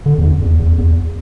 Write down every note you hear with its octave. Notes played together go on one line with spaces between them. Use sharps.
D3
E2
F2
E2
E2
F2
E2